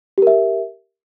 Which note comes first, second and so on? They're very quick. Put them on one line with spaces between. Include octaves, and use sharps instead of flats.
G4 A#4 E5